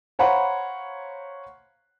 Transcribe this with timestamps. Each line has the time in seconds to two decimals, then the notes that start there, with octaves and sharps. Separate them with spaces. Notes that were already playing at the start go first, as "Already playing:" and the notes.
0.19 C5 C#5 F5 F#5 A#5 B5